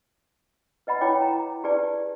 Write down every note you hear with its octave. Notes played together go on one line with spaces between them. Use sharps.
B4 D#5 F#5 B5
E4 C#5 G5 D6
A#5
G4 G#4 B4 D5 A5